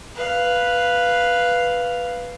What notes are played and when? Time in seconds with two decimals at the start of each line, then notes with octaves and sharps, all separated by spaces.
0.15 B4 F5